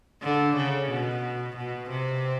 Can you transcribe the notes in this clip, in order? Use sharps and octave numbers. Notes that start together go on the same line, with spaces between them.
D3
C#3
B2
B2
C3